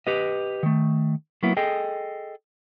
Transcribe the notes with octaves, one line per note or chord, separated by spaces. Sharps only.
G4 B4 D#5
D#3 A3
F#3 A#3 B3 E4
G#4 A4 D#5 G5